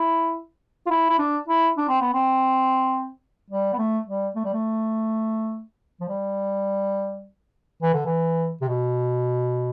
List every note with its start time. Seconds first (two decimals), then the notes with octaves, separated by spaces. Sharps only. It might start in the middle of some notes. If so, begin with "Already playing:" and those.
Already playing: E4
0.86 F4
0.90 E4
1.10 E4
1.19 D4
1.48 E4
1.77 D4
1.88 C4
2.01 B3
2.13 C4
3.50 G3
3.73 B3
3.78 A3
4.08 G3
4.36 A3
4.45 G3
4.53 A3
6.01 F3
6.08 G3
7.83 E3
7.94 D3
8.05 E3
8.61 C3
8.68 B2